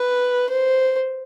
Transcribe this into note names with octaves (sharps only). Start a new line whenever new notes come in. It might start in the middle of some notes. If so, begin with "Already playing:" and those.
Already playing: B4
C5